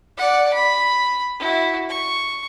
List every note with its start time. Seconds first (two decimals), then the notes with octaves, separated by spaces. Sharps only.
0.17 D5 F#5
0.53 B5
1.39 E4 F#4
1.89 C#6